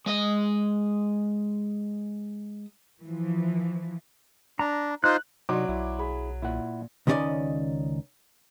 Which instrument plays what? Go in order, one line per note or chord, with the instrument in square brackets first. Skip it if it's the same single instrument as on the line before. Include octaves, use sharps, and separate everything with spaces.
[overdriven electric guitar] G#3 D#5
[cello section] E3 F3
[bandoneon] D4 [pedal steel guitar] A#5
[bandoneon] D#4 F4 C5 [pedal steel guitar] F#6
[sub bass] C3 [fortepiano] F#3 [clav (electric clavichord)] D#4 [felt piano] D5 C6 D6
[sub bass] B1 [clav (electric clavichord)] E4
[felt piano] G#4 B5
[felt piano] A#2 [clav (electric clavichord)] E4 F#5
[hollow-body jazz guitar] C#2 D#3 C#4 G#4 D5 D#5